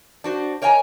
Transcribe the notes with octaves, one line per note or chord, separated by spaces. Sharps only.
D4 F#4 C5
A#4 C#5 D#5 F#5 G#5 A#5